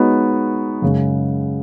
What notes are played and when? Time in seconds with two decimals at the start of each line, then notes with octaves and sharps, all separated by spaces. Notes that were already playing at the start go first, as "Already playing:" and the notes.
Already playing: G#3 B3 D#4 F#4 C#5
0.82 F#2 C#3 G#3